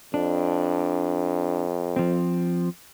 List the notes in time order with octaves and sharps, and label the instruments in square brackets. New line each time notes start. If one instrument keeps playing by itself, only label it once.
[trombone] F2 [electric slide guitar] D4
[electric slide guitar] F3 C4